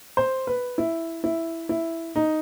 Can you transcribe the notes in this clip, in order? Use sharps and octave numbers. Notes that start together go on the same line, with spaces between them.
C5
B4
E4
E4
E4
D#4